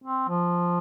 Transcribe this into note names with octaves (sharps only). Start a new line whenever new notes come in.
C4
F3